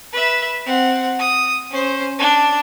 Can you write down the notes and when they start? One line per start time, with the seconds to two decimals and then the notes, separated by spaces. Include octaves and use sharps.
0.13 B4 E5
0.66 C4 F#5
1.19 D#6
1.71 C#4 C5
2.19 D4